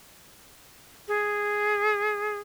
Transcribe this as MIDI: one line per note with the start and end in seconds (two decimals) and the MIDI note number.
1.08 2.39 68